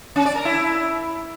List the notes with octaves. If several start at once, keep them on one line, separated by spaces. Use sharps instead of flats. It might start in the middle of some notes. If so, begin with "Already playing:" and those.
C#4
D5
A#4
E4